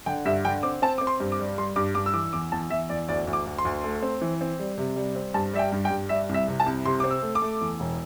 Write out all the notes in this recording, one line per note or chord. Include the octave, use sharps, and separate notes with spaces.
D3 G5
G2 E5
D3 G5
C4 D6
C4 A5
C4 D6
C6
G2
D6
G3
G3 C6
G2 D6
G2 D6
E6
E3 D6
E2 D6
E2 A5
E2 E5
E2 D5
D2 D5
D2
D6
D2
C6
D2
A3
C4
E3
C4
G3
C3
G3
C4
G2 A5
G3 E5
G5
G2
G5
G2
G3 E5
C2
E5
C3
A5
C2
C3 C6
C4 D6
E6
A3
D6
A3
E2
E1